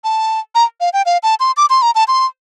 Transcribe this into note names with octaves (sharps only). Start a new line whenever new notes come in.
A5
A#5
F5
G5
F5
A5
C6
D6
C6
A#5
A5
C6